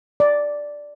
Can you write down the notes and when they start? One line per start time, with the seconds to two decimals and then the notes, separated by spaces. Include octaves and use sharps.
0.20 D5